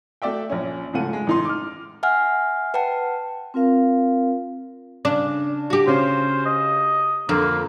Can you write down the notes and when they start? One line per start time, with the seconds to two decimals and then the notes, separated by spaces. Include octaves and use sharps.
0.22 A3 F#4 D5 E5 G5
0.50 A#1 C#4
0.93 G#2 C#3 F3 A3 F#5 D#7
1.13 G#3
1.27 A1 D#4 C6
1.45 D6 F6
2.03 E5 F#5 G#5 F6
2.74 B4 F#5 G5 A5
3.54 C4 F4 A#4 F5
5.05 C#3 D4
5.70 F#4 G4
5.87 C#3 C#4 C5
6.45 D#5
7.29 F2 D3 A#3